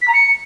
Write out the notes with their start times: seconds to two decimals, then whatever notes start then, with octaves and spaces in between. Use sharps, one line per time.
0.02 B6
0.08 A#5
0.14 C#7